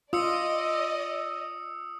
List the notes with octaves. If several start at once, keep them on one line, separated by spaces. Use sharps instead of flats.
F4 D5 D#5 D#6 E6 C#7